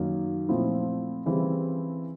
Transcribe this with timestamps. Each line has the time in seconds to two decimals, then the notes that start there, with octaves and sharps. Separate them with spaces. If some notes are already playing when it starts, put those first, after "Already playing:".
Already playing: F#2 D#3 F#3 A#3
0.49 A#2 F3 A3 C4 E4
1.26 C#3 E3 G3 C4 E4